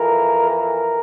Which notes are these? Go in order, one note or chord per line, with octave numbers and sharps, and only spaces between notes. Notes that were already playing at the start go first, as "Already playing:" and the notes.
Already playing: F2 E3 A#4
A#4